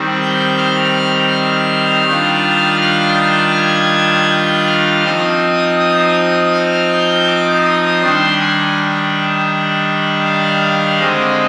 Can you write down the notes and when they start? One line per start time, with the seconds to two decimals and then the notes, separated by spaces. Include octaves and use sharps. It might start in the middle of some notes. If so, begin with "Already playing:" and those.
Already playing: D#3 G3 C4
0.21 G6
0.58 F6
2.07 D#3 G3 D4 F4
2.81 F6
3.55 G#6
4.30 G6
4.67 F6
5.05 F3 C4 D#4 D#6
5.79 D#6
6.53 F6
6.90 G6
7.28 D6
7.64 D#6
8.01 D#3 G3 D4 C6
8.39 G#5
10.26 F5
11.00 D3 G#3 C4 D#5